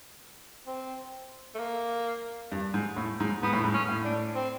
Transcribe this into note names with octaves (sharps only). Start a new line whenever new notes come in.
C4
A3
A#3
G2
G#2
A2
G#2
G#2 B3
A2
G#2
C#4
A2
D4
C4